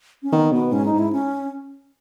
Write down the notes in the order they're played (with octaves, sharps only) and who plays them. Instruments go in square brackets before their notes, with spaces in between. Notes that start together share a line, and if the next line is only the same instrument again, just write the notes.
[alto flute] C#4
[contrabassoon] D#3 [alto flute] B3
[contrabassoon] B2 [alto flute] B3
[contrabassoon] G#2 [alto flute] C#4
[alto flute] D#4
[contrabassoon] G#2
[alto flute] E4
C#4